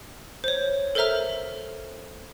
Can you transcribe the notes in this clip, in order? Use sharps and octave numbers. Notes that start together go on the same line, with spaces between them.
C5 C#5
A4 A#4 C5 E5 A#5 F6